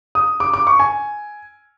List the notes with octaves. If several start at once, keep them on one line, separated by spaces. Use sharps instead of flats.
D#6
D6
D6
C#6
G#5